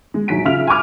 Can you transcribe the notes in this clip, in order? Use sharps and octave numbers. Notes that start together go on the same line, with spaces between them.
G#3
A#1 F#3 D#4 B6 D7
C#3 F4 E5 F6 F7
G#5 B5 C#6 D6 F6